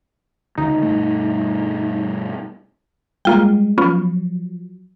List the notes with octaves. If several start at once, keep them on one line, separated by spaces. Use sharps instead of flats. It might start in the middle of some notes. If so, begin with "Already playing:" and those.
C#2 D3 D#4
G2 B2 A3
G3 G#3 A#3 F4 G5
F3 F#3 B3 C#4 F4